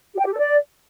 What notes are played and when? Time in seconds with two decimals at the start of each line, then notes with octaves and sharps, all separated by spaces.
0.13 G4
0.19 G5
0.26 G4
0.32 A4
0.38 D5